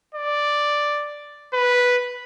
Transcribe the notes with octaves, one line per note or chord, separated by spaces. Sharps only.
D5
B4